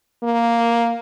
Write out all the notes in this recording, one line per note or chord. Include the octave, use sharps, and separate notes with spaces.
A#3